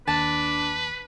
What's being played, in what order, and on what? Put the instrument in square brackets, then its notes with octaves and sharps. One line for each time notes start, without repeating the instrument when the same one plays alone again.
[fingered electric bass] D#2 [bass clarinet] D4 [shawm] B4 [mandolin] A5